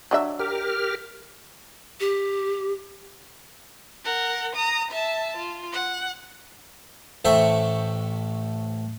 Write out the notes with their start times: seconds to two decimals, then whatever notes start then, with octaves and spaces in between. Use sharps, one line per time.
0.11 F#3 D4 E5
0.39 G4 A#4 F6
2.00 G4
4.05 A#4 F#5
4.56 A#5 D#6
4.91 E5 A5
5.37 F4
5.72 F#5
7.25 A1 A3 C5 E5 G5 C#6